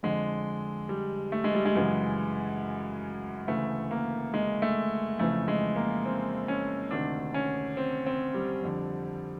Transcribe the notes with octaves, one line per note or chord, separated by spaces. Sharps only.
F2 D3 G#3
G3
A3
G#3
G3
G#3
F#2 C#3 E3
D2 C#3 E3 A3
A#3
G#3
A3
F2 C#3 E3 A3
G#3
A#3
C4
C#4
D2 C3 D#3 D4
C#4
C4
C4
G3
F2 D3